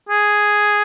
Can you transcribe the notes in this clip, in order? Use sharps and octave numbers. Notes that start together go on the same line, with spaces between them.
G#4